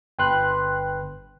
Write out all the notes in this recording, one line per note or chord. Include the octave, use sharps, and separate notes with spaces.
G1 B4 G5 C6 F#6